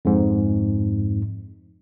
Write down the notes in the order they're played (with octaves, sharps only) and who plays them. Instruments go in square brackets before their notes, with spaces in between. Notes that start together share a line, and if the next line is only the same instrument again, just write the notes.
[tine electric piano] F2 G#2